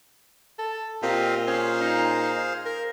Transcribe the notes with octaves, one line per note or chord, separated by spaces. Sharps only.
A4
A#2 C4 G4 D#5 F5
C#4 G#4 C5 F5
D#4
A#4